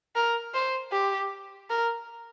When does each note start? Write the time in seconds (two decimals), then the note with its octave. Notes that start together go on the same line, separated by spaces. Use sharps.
0.15 A#4
0.54 C5
0.92 G4
1.70 A#4